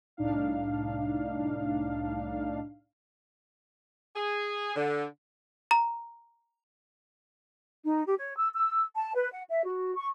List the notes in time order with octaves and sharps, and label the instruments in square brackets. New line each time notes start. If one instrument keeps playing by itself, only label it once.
[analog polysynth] C2 A2 D4 D#4 F5
[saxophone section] G#4
D3
[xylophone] A#5
[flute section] D#4
G4
C#5
E6
E6
A5
B4
F#5
E5
F#4
C#6